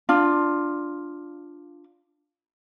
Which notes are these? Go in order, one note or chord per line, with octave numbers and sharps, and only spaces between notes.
D4 F4